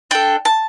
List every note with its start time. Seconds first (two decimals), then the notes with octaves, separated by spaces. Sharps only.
0.11 D4 A4 G5
0.45 A5